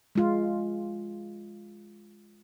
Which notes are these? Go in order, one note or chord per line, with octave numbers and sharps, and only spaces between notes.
G#3 F4